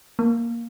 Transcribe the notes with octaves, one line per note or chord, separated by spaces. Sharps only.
A#3